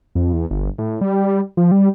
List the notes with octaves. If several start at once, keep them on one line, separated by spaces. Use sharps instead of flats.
F2
E2
G1
A2
G3
G3
F3
G3